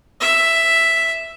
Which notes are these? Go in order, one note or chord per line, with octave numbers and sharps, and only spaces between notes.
E5